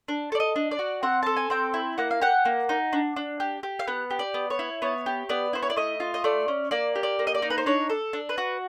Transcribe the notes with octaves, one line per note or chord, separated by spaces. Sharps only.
D4
A4 D5
D#5
D4
D5
F#4
C4 F#5
A4 A5
G#5
C4 G5
E4
A#3 F#5
F5
G4 F#5
A#3
D#4
D4
D4
G4
G4
F5
B3 F#5
G4
D5
B3
C#5
E4
B3 C#5
G4
B3 D5
E4 C5
C#5
D5
A3 D#5
F4
D#5
A3 D5
C#4
A#3 D5
G4
D5
A#3
D#5
D5
D#4
B4
C5
D4 C#5
A4
D4
B4
F#4